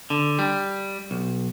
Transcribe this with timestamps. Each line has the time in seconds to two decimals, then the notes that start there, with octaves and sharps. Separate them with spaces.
0.10 D3
0.39 G3
1.11 B1